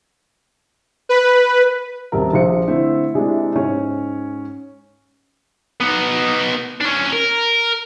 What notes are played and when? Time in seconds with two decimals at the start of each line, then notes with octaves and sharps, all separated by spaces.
1.09 B4
2.12 D#1 C3 A#4
2.33 A#1 F3 C5 C#7
2.68 D3 A3 C4 E4
3.14 C3 G#3 D4 E4
3.56 G#2 C#4 C#5
5.81 B3 D#4
6.81 C#4 D4
7.13 A#4